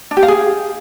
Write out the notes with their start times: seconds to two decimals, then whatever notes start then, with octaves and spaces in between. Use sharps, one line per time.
0.11 D4
0.17 G4
0.23 F5
0.28 G#4